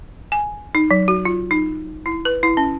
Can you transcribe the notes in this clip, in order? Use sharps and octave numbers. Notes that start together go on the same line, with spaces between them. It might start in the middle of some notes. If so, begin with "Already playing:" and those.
G#5
D#4
F#3
F#4
F4
D#4
E4
B4
E4
C#4